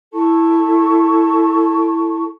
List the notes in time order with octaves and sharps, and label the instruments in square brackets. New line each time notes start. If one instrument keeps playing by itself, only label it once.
[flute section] E4 A4 A5 C#6